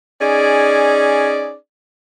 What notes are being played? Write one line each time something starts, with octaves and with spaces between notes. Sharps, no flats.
C#4 D#4 G#4 D5